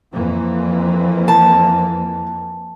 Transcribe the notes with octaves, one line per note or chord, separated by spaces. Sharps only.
F2 E3 A#3
A5